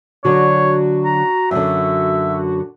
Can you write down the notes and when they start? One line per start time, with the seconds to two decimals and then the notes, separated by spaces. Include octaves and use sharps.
0.25 D3 F#3 D4 F#4 C#5
1.05 A#5
1.51 F#2 D3 E5